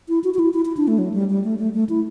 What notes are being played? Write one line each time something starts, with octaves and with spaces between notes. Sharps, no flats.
E4
F#4
F#4
E4
E4
E4
D4
A3
F#3
G3
G3
A3
A3
A3
E4